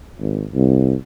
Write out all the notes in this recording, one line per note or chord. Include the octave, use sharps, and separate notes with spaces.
G#1
C2